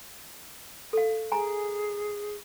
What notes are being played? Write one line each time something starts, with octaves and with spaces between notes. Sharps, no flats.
A4 F5
G#4 G#5 A#5